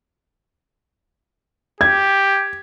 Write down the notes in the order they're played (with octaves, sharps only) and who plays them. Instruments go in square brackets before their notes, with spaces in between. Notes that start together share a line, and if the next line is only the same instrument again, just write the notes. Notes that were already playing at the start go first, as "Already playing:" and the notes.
[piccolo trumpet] G4 [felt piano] G#6